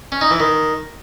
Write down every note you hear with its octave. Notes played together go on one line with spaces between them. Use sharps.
C#4
D#4
E3
D#3